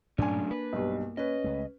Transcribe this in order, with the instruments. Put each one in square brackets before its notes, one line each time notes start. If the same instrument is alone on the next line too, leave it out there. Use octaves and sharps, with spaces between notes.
[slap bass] G2 A#2 [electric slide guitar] F#3 A3 C#4 [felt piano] D4 G#5
[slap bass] A#3 [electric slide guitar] B4
[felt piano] B1 G2
[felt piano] C#4 B4 [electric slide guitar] D#5
[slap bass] C#2 G#3 A3